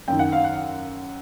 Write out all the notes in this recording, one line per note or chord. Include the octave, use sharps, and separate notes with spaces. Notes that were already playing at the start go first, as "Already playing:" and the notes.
F#2 D#3 G5
F#5
F5
F#5